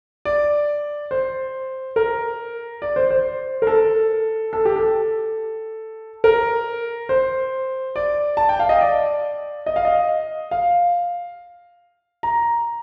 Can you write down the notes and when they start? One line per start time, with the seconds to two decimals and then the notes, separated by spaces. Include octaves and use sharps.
0.25 D5
1.11 C5
1.96 A#4
2.82 D5
2.96 C5
3.11 C5
3.62 A#4
3.67 A4
4.53 A4
4.65 G4
4.76 A4
6.24 A#4
7.09 C5
7.96 D5
8.37 A5
8.49 G5
8.60 F5
8.69 D#5
8.81 D5
9.66 D#5
9.76 F5
9.85 D#5
10.51 F5
12.23 A#5